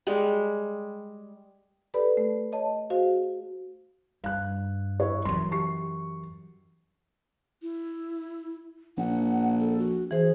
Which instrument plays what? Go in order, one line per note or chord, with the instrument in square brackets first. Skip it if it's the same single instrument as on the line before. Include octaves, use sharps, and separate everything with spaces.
[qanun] G3 G#3
[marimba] G4 A4 B4 D5 B5
A3
C#5 D#5 A5
F#4 G#4 C5 F5
[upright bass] G2 [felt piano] F5 F#6
[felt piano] E4 C#5
[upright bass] F#2 E3 [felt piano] C6
[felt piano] G4 C#6 C7
[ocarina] E4
[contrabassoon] A#1 [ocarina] F#5
[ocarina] A4
F#4
[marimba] E3 C5 [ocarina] G#4